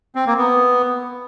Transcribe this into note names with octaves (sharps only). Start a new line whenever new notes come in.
C4
A#3
B3